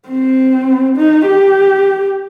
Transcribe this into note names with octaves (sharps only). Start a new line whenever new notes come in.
C4
D#4
G4